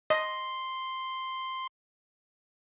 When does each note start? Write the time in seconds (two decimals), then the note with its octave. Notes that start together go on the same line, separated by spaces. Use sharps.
0.10 D#5 C6